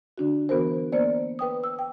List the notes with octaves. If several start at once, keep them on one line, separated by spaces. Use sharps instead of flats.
D3 D4 F#4
E3 B3 F#4 A#4 C5
A#3 B3 C5 D5
B4 G5 D#6
E6
G5